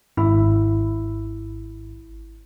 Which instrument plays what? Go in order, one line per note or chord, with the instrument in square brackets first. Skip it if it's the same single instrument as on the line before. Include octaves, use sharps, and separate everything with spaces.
[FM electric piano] G#1 [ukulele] E4